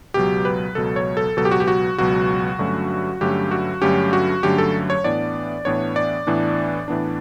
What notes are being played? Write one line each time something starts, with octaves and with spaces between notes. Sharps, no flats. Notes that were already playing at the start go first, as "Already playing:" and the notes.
C#2 B2 F#3 G4
B4
C#2 B2 F#3 A4
C#5
A4
C#2 B2 F#3 A4
G4
F#4
G4
F#4
C#2 B2 F#3 F#4
G2 D3 F#3 A3 C#4
G2 D3 F#3 A3 C#4 G4
F#4
G2 D3 F#3 A3 C#4 G4
F#4
G2 D3 F#3 A3 C#4 G4
A4
C#5
A2 E3 B3 D4 D5
A2 E3 B3 D4 C#5
D5
A2 E3 B3 D4
A2 E3 B3 D4